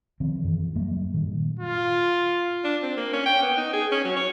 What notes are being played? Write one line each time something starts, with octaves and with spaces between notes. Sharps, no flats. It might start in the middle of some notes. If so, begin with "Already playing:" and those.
D#3 F3 C4
F#2 E3
F#3 G3 A#3
G2 A#2 D#3
F4
D4
C4
A#3
C#4
G5
B3
D#4
G#4
C#4
F#3
C#5